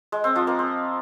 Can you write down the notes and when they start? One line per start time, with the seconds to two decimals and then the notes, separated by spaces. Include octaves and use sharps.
0.12 G#3
0.24 C4
0.36 F3
0.47 A#3
0.59 C4